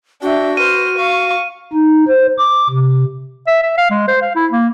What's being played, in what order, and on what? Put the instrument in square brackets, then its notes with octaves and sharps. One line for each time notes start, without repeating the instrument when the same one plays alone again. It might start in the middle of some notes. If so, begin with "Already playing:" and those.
[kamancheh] D4 E5 [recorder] F#4 [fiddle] G5
[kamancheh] B4 [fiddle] C5 F6 [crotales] D#7
[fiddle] F5 [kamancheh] C#6
[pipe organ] D#4
C5
D6
C3
[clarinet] E5
E5
F5
G#3
C5
F5
E4
A#3